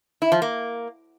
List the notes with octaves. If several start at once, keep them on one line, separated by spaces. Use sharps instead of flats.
E4
F3
A#3